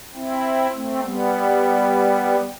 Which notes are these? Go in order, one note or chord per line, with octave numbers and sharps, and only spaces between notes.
C4 E4
A3 C4
G3 B3